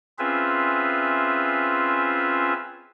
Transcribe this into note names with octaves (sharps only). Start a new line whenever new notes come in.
C4 C#4 F4 G#4 B4 E5